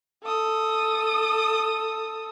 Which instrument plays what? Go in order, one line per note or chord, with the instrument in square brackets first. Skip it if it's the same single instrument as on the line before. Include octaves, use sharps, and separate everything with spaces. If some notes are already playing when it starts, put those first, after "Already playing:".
[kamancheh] A4 D#6